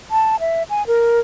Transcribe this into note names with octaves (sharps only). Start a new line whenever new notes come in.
A5
E5
G#5
A#4